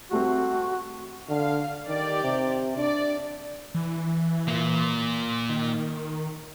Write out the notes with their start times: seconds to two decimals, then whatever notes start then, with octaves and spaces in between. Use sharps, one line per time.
0.11 G3 A3 C4 F#4
1.29 D3 F5
1.88 D#3 G4 D5
2.23 C3
2.77 D4 D5
3.75 E3
4.48 A#2 A#3
5.49 D#3